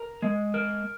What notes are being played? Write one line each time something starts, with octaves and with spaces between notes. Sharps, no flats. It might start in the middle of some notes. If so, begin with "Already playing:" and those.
Already playing: A#4
G#3
A#4